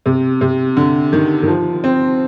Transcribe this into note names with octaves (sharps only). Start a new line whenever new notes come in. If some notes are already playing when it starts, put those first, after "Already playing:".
C3
C3
D3
D#3
D#3
F3
C4